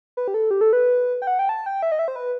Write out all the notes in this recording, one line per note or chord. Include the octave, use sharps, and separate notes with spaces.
B4
G4
A4
G4
A4
B4
G5
F#5
G5
A5
G5
E5
D#5
E5
C5
B4